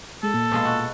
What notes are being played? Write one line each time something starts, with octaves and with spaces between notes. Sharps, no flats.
G#3 A4
A#2
B2 G#3 F4
F#4